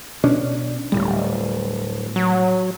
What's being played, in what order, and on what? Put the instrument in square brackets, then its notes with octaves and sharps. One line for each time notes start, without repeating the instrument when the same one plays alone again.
[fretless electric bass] B2 C#4 D4
[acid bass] D1 [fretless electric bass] A2 G3
[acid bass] F#3